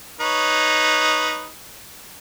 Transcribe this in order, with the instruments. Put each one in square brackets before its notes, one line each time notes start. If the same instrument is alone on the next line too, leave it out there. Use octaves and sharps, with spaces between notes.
[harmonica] D#4 B4 C#5